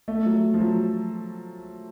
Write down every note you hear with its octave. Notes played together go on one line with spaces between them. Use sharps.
A3
F#3
F3
F#3